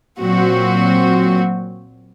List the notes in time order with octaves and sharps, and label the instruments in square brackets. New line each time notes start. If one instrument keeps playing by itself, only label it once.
[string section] A#2 F#3 C4 F#4